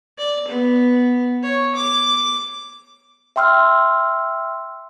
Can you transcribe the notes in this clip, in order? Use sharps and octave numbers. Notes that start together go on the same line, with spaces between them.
D5
B3
C#5
D6
E5 G5 C6 E6 F6